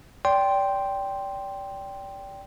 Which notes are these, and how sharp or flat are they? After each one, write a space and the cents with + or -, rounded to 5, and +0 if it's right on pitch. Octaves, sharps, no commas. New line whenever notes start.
D5 -30 G5 +0 C6 +0